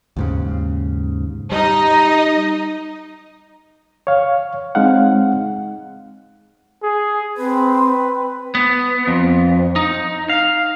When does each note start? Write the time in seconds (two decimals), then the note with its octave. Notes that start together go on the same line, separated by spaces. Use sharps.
0.17 D#2 G#2 C#3
1.52 G3 D#4 D#5
4.07 C#5 F5
4.75 G#3 C4 D#4 F5 F#5
6.82 G#4
7.37 C4 B4
8.55 B3
9.07 F2
9.76 D#4
10.30 F5